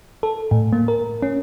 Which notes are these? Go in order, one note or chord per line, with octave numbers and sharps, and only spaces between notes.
A4
A2
A#3
A#4
C#4